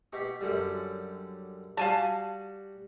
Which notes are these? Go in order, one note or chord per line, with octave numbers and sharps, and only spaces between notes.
B2 G4 C#6
F#2 D3 G3
G3 F#4 F5 G#5 A5